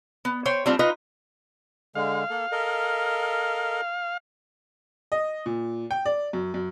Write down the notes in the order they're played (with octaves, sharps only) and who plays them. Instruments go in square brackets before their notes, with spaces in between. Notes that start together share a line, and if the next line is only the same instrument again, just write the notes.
[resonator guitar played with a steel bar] B3
C5 C#5 G5
G3 A3 C4 D4 F4
D#4 F4 B4 D#5
[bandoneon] D3 G#3 [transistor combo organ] F5
[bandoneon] A#3 A4
A4 A#4 D#5
[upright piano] D#5
A#2
G5
D5
F#2
F#2